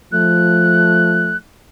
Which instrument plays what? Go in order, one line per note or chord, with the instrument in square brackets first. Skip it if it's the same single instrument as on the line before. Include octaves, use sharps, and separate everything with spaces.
[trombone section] F3 A3 [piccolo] F#6